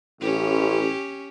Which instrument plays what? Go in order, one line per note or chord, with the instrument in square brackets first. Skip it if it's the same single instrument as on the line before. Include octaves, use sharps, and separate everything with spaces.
[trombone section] A1 [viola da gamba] C#4 G4